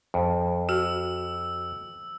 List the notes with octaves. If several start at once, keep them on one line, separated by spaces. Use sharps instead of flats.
F2
F#4 E6